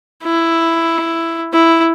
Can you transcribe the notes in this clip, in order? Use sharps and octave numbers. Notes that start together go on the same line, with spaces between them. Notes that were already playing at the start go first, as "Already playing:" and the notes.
E4
E4